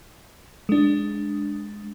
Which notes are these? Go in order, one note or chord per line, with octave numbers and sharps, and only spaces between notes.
G#3 D4